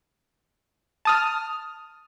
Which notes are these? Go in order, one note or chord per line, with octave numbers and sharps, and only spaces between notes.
A5 D#6 F6